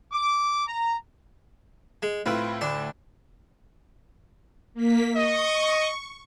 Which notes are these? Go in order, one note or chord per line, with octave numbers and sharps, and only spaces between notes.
D6
A#5
G#3
A2 C4 E4 F4 B4
D2 D4 D5
A#3 B6
D#5 C#6